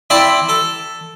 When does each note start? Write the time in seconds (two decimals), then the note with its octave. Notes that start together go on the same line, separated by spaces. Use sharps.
0.10 C4 E4 D5 E5 B5
0.49 A4